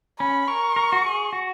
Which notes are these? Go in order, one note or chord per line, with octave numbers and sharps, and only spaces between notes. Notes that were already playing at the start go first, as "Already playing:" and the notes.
C#4 B5
A#4 C#6
A#4
F#4
G#4
F#4